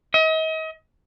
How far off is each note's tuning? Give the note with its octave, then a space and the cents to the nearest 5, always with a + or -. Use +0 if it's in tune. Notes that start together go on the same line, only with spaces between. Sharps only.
D#5 +40